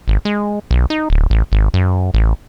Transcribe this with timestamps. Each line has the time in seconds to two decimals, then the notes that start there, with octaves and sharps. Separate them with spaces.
0.08 G#1
0.25 G#3
0.71 B1
0.90 D#4
1.10 D1
1.30 A1
1.52 G#1
1.74 F#2
2.14 A1